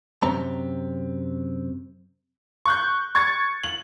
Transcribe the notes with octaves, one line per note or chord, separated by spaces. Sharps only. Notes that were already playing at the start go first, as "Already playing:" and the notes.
F#2 C3 C4 A#5
C#6 F#6 G6
C#6 G#6 A6 C#7
F#7